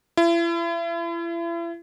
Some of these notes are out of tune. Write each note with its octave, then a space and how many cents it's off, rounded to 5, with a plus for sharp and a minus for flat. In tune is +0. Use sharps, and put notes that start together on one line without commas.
E4 +40